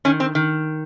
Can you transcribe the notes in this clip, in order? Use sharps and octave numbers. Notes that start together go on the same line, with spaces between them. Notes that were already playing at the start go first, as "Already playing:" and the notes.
D#3 C#4
C4
D#3